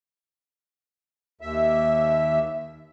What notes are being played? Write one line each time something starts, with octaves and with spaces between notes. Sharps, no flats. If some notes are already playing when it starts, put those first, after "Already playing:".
D#2 E5